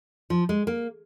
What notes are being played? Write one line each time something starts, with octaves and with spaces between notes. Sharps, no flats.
F3
G#3
A#3